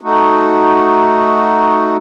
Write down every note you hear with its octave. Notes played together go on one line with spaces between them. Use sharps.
A3 D#4 F#4